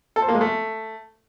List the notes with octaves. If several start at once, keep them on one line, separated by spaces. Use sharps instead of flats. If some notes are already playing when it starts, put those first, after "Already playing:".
A4
C5
A#3
G#3
A3